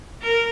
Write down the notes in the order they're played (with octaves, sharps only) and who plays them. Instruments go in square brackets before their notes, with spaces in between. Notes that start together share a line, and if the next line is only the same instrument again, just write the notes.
[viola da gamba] A#4